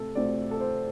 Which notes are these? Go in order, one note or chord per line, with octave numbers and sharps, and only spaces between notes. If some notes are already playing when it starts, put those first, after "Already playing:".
Already playing: C3 A3 C4 A4
D2 C3 A3 C4 D5
A4
C5